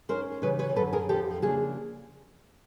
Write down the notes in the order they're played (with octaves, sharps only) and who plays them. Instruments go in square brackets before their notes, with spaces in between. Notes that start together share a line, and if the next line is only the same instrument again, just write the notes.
[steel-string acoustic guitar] G#2 D#3 G#3 C#4 A#4 C5
C#3 E3 G3 B4 C#5
B4 C#5
F#2 D3 F#3 A4 B4
G#4 A#4
F2 D3 F3 G4 A4
C#3 F3 A#3 D4 F#4 G#4